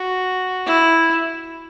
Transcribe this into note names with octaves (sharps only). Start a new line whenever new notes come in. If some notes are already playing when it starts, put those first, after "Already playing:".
Already playing: F#4
E4